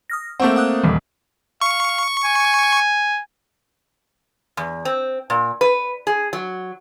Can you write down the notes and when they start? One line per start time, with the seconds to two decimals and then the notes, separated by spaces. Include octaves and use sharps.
0.10 D#6 F6 A#6
0.40 A3 A#3 C4 F#5 C#6 G6
0.56 F#5 D#6 F#6
0.83 D#1 D#3 E3 G3
1.61 F5 C#6
2.26 G#5
4.57 E2
4.85 C4
5.30 A#2
5.61 B4
6.07 G#4
6.33 F#3